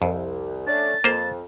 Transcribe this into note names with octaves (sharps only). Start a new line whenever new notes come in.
C2 F2
A3 C#4 D4 A6
F2 A#3 C5